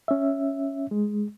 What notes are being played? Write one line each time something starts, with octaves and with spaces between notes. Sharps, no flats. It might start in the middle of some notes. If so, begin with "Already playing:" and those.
C#4 E5
G#3